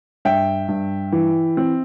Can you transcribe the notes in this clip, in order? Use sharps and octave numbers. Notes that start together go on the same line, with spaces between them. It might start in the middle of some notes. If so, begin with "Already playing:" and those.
G2 E5 G5
G2
E3
C4